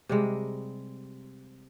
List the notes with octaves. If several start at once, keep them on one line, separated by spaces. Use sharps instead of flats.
C3 G3 G#3